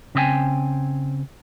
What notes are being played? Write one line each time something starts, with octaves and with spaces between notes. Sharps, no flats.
C#3 C4 D#5 G5 G#5